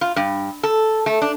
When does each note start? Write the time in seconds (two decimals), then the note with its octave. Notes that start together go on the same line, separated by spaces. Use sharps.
0.01 F4
0.16 G2
0.63 A4
1.06 A3
1.22 D4